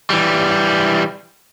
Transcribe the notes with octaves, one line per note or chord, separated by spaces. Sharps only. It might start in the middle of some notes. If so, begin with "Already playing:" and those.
E3 G3